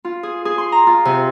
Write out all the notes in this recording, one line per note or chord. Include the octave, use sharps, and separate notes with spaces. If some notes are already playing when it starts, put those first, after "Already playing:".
F4
G#4
G#4
C6
A#5
F4
C3